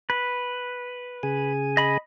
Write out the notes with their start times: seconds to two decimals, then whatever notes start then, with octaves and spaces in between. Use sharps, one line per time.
0.10 B4
1.23 C#3 G#4 G#5
1.77 D#5 B5